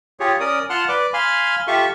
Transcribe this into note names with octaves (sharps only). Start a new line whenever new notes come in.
F4 G4 G#4 C#5
C#4 A#4 D5 D#6
F4 F#5 A5 C6 F6 F#6
B4 D5 D6
F5 G#5 B5 C6 F6
F4 G4 A4 E5 F5 C#6